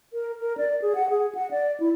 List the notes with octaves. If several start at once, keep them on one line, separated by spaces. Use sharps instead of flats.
A#4
A#4
D5
G#4
F#5
G#4
F#5
D5
E4